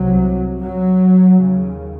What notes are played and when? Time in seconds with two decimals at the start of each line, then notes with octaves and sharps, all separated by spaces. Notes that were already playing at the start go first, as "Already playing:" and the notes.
Already playing: C2 C3 F#3
0.60 F#3
1.42 D#2 C#3